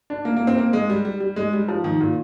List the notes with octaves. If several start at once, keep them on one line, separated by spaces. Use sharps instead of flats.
D4
A#3
A#3
C4
A#3
G#3
G3
G3
G3
G#3
G3
F3
D#3
A#2